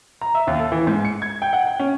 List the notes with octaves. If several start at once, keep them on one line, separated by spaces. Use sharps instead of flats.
A#5
E5
D#2
A4
E3
G#2
C#7
G#6
G5
F#5
G5
C#4